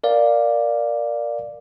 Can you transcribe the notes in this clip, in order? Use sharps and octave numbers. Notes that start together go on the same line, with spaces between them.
A#4 D5 F5